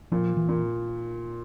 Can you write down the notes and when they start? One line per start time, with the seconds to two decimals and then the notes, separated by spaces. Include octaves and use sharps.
0.12 A#2 F3
0.37 E3
0.49 A#2